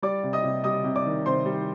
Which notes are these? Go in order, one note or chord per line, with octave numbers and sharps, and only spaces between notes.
G3 D5 D6
C3
D#5 D#6
C3
G3 D#5 D#6
C3
D5 D6
D#3
C3 C5 C6
G3